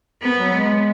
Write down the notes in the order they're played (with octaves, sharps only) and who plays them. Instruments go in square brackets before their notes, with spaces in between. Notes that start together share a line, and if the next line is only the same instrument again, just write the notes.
[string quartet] B3
[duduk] F#3
G#3